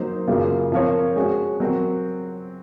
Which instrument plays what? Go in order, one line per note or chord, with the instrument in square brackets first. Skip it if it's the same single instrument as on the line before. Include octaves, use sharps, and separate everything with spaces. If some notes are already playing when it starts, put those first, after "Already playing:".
Already playing: [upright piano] F#3 A#3 D#4 C5
F#2 C#3 F#3 A#3 F4
F3 C4 F4 A#4 C#5
G#3 C#4 F#4
F#3 C4 F#4 A#4